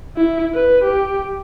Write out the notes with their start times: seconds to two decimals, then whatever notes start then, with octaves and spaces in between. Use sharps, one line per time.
0.16 E4
0.55 B4
0.84 G4